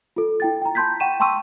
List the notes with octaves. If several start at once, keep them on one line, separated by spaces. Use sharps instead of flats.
F4 A4
E4 G5 A6
G5 A#5
A5 B5 C6 G6 G#6 B6
F#5 G5 C#6 D#7 E7
G5 A5 C6 C#6 E6 D#7